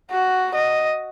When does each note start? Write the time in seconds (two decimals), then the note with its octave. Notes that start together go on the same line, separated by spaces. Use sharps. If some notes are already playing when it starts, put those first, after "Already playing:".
0.12 F#4
0.54 D#5